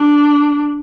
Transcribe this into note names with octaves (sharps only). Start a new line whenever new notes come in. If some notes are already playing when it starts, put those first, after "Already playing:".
Already playing: D4